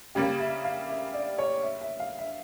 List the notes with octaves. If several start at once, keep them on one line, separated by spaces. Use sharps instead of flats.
C#3 G3 A#3 G4
E5
F5
E5
D5
C#5
E5
E5
F5
E5